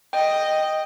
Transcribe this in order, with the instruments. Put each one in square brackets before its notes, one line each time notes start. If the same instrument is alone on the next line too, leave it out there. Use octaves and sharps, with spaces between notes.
[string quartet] D#5 [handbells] G5